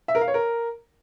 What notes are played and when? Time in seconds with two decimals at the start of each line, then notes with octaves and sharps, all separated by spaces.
0.08 E5
0.15 A#4
0.21 F5
0.28 C#5
0.34 A#4